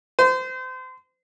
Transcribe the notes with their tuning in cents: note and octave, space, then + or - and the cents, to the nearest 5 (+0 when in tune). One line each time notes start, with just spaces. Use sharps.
C5 -30